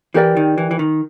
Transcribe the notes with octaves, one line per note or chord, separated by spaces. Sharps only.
E3 G4 A#4 D5 G5
D#3
E3
E3
D#3